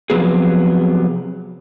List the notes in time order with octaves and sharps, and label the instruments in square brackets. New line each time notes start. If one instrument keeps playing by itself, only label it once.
[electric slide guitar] C3 F3 F#3 B3 G#4